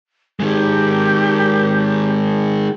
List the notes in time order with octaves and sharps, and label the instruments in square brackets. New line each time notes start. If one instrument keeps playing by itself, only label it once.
[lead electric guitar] D#3 G#3 [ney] G4